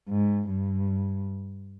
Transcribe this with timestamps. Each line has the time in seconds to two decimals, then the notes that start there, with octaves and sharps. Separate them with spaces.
0.09 G#2
0.49 G2